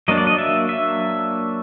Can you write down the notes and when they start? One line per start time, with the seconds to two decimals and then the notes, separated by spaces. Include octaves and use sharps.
0.08 F#3 A#3 D4 D#5
0.18 D5
0.27 D#5
0.38 E5
0.69 E5